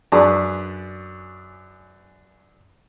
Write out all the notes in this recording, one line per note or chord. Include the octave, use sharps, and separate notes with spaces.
F#2 D4 G#4 B4 D5 C#6